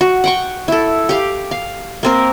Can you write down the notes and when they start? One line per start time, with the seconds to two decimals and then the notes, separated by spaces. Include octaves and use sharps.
0.01 F#4
0.24 F#5 G5 C#6
0.68 E4 A4
1.09 G4 F5
1.51 F5
2.03 A#3 C4 A#4